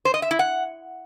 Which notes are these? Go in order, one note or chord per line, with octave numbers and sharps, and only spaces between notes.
C5
D#5
E5
E4
F#5